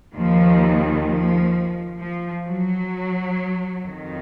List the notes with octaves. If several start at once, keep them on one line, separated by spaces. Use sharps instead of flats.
D#2 D#3 F3
F3
F3
F#3
F2 D#3